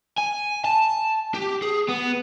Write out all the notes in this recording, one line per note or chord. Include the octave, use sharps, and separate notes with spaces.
G#5
A5
G4
G#4
B3